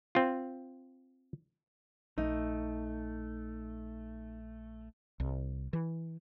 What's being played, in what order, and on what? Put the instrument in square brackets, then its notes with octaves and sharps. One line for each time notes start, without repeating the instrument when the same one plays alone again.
[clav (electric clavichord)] C4 F4
[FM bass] A#1 [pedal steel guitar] A3 [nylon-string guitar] D#4
[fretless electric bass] C2
E3